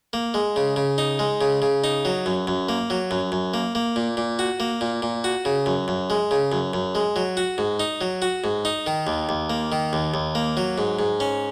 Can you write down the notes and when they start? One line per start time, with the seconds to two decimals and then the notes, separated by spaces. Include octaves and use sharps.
0.13 A#3
0.34 G#3
0.56 C#3
0.76 C#3
0.98 D#4
1.19 G#3
1.41 C#3
1.62 C#3
1.84 D#4
2.05 F#3
2.26 F#2
2.47 F#2
2.69 A#3
2.90 F#3
3.11 F#2
3.32 F#2
3.54 A#3
3.75 A#3
3.96 A#2
4.17 A#2
4.39 F#4
4.60 A#3
4.81 A#2
5.02 A#2
5.24 F#4
5.45 C#3
5.66 F#2
5.88 F#2
6.10 G#3
6.31 C#3
6.52 F#2
6.73 F#2
6.95 G#3
7.16 F#3
7.37 F#4
7.58 G#2
7.80 D#4
8.01 F#3
8.22 F#4
8.44 G#2
8.65 D#4
8.87 D#3
9.07 D#2
9.29 D#2
9.50 A#3
9.72 D#3
9.93 D#2
10.14 D#2
10.35 A#3
10.57 F#3
10.78 G#2
10.99 G#2
11.20 C#4